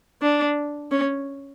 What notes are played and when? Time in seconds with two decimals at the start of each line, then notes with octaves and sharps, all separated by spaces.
0.22 D4
0.91 C#4